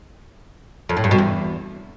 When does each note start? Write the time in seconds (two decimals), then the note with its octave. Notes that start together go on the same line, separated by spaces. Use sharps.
0.89 F2
0.97 A2
1.04 G2
1.11 B2
1.18 E2